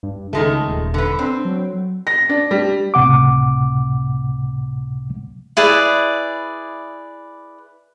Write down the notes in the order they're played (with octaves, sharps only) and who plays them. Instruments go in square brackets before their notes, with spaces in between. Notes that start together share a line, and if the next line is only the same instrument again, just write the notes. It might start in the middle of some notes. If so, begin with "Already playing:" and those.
[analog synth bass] G2
[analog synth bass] C#2 [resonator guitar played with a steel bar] D#3 G#3 A3
[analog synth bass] D#1
[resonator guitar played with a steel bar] D3 B4
[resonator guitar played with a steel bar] C4 [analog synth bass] D4
[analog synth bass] F#3
[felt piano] A#6
D4
G3
[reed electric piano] C#2 A2 C3 F#5 D6
[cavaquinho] E4 G#4 B4 D5